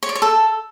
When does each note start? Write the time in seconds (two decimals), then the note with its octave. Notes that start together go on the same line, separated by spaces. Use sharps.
0.03 C#5
0.09 D5
0.15 C#5
0.22 A4